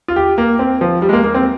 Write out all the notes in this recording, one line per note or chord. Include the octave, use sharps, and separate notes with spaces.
F4
G4
A#3
C4
F3
G3
G#3
A#3
A#3
C4